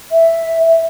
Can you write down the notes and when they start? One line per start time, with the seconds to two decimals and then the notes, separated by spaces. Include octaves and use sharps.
0.12 E5